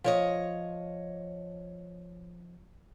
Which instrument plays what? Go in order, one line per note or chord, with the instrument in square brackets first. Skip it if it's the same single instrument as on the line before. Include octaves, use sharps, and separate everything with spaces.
[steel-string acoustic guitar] F3 C#5 D#5